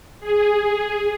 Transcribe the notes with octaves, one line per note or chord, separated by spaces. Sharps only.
G#4